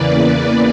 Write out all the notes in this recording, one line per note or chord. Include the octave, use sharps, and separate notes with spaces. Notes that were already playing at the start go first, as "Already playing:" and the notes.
Already playing: E2 C#3 E3 A#3 B4 D5